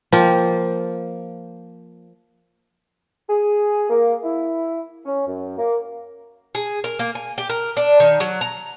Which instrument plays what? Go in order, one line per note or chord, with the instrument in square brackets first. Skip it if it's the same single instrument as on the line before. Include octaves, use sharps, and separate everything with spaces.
[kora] F3 A#3 G5
[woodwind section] G#4
A#3
E4
C#4
F#2
A#3
[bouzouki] G#4
A#4
A#3
G#5
G4
A#4
D4
D#3
F#3
A#5